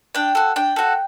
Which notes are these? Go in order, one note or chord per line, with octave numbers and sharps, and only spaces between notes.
D4 G5
F#4 A4
D4 G5
F#4 A4